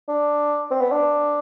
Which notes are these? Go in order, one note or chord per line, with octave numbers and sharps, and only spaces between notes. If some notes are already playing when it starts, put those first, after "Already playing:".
D4
C4
B3
D4